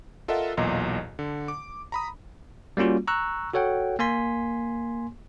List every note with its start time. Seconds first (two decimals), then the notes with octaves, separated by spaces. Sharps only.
0.28 F4 A4 A#4 D#5 E5 F#5
0.57 B1 E2 A#2 D#5 A#5
1.19 D3
1.48 D6
1.92 A#5 B5 D#6
2.77 G3 A#3 C#4 F4 F#4
3.08 A#5 C#6 E6 F#6
3.53 F#4 A4 C#5 F#5 G5
3.99 A#3 G#5 C6 B6